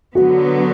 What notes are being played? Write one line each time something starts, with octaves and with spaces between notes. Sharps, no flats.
D3 F#3 B3 F#4